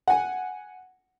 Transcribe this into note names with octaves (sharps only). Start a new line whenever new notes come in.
F#5 G#5